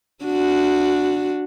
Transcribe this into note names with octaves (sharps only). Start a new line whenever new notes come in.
D4 F#4